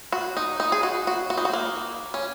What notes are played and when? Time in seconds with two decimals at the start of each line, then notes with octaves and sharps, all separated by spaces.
0.12 F#4
0.37 D#4
0.60 D#4
0.72 G#4
0.83 F#4
1.07 F#4
1.30 F#4
1.38 D#4
1.45 F#4
1.53 A#3
2.14 C#4